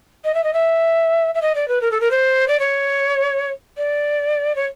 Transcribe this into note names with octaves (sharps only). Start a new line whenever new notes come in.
D#5
E5
D#5
E5
E5
D#5
D5
B4
A#4
A4
A#4
C5
D5
C#5
D5
C#5